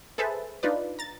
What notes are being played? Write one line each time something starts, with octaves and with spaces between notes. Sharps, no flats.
G#4 A4 B4 C5 E5 A5
D4 D#4 F4 B4 D5
A#5 A6